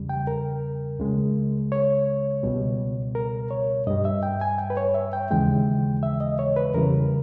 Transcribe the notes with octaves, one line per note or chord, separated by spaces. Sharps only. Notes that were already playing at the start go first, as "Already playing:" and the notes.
Already playing: E2 C#3 G3
G5
A#4
C#2 C#3 G#3
C#5
C#2 B2 G3
A#4
C#5
G2 G3 D#5
E5
G5
G#5
G5
B4
C#5
E5
G5
D#2 C#3 E3 G#3 G5
E5
D#5
C#5
B4
E2 C#3 E3 G3 A#4